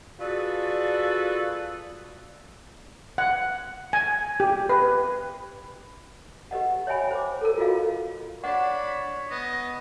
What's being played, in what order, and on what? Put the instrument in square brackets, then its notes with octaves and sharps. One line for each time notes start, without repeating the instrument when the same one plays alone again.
[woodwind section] F4 F#4 G#4 A4 B4 D5
[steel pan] F#5
G#5
G4
B4
[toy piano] G4 B4 D#5 F#5
C#5 D#5 E5 G5 G#5 B5
C5 D6
A4 A#4
F4 F#4 D#5 F5
[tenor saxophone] D4 [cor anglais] C#5 [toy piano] F#5 [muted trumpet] B5
[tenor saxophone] B3 [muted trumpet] D#5